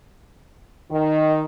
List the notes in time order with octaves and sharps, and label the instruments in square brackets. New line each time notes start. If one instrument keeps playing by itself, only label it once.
[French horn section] D#3